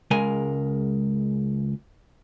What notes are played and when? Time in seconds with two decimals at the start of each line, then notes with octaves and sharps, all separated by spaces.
0.11 C#2 G#3 A#4 G#5